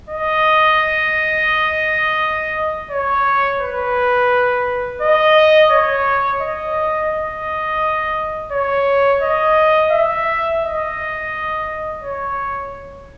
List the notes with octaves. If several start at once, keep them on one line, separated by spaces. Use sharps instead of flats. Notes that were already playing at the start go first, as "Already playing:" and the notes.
D#5
C#5
B4
D#5
C#5
D#5
D#5
C#5
D#5
E5
D#5
C#5